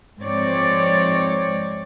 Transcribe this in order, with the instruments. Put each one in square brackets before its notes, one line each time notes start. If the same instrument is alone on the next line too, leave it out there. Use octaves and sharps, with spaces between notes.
[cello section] G#2 F3 C4 C#5 D5